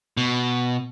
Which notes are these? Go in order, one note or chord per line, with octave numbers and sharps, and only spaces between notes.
B2